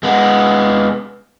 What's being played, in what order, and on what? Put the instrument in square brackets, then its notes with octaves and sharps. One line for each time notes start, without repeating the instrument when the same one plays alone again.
[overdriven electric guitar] G#3 B3